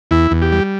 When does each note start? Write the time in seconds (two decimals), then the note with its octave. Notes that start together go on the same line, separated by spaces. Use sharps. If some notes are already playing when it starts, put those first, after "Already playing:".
0.11 E2 E4
0.31 E2
0.42 G4
0.52 G3